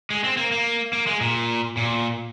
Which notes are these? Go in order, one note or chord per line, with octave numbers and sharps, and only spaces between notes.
G#3
C4
A#3
A#3
A#3
G#3
A#2
A#2